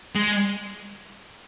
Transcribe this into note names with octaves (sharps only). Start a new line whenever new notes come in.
G#3